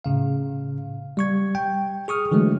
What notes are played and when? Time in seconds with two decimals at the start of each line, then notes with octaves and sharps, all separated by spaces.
0.04 A2 C#3 F5
1.17 G3 C#6 G#6
1.55 G5
2.08 G#4 C#6 D#6 F6
2.32 D3 E3 F#3 G#3 A3